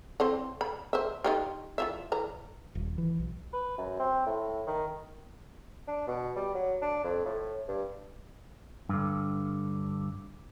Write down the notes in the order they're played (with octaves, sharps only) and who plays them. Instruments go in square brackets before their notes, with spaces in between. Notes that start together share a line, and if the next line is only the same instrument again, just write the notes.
[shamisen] E3 C4 C5
B5
C5 E5
D#4 F4 G4
E3 F4 E5
E3 A#5
[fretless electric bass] D#1
E3
B1
[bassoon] B4
F#2
C4
A2
D#3
D4
B2
G3
F#3
D4
F2
A2
G2
[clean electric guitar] G2 D3